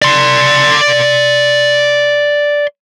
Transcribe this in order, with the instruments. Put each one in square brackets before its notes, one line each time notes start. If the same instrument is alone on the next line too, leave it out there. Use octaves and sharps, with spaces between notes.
[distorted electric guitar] D5 C6